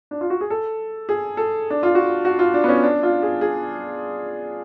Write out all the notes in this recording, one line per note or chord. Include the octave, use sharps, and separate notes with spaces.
D4
F4
F#4
G#4
A4
G#4
A4
D4
F4
F#4
F#4
F4
D4
B3
C#4
D4
F4
G#4
G#4